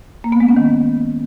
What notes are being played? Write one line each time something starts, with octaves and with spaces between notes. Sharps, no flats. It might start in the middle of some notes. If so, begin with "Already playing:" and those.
A#3
B3
G#3
C#4
D#3